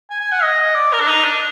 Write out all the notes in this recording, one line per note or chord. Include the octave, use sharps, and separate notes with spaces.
G#5
G#5
F#5
D#5
D5
A#4
D4
D#4
D4